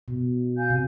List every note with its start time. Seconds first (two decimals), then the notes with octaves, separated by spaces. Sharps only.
0.08 B2
0.56 F5 G#5 G6
0.70 C3